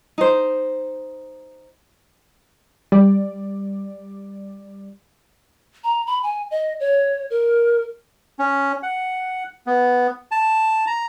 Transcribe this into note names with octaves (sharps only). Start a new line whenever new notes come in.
D#4 C5
G3 D5
A#5
B5
G#5
D#5
C#5
A#4
C#4
F#5
B3
A5
A#5